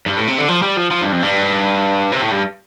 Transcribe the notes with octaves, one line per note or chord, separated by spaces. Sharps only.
G2
A2
C3
D3
F3
G3
F3
F3
G2
F2
G2
C3
A2
G2